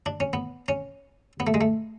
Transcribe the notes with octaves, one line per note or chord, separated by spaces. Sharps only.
D4
C#4
B3
C#4
B3
A3
G#3
A3